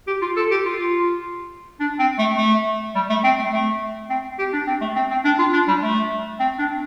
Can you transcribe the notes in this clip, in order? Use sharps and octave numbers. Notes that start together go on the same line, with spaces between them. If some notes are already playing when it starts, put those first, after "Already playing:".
G4
F4
A4
G4
F4
D4
C4
A3
A3
G3
A3
C4
A3
A3
C4
G4
D4
C4
A3
C4
C4
D4
F4
D4
G3
A3
C4
D4